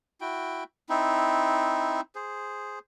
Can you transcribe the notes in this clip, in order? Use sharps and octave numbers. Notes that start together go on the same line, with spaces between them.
E4 F#4 G5
C4 D#4 E4
G#4 C5